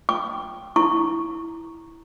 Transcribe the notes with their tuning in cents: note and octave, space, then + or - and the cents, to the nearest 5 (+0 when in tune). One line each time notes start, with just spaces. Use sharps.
G5 +0 C#6 +35
E4 +0 C#6 +0